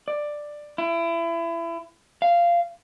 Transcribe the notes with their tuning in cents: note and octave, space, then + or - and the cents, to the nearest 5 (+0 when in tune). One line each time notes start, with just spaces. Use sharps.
D5 +10
E4 +30
F5 -15